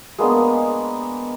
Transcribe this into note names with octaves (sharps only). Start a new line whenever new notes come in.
G#3 A#3 B3 D4